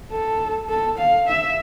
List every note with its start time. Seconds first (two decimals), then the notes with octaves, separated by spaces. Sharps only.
0.12 A4
0.69 A4
0.98 F5
1.28 E5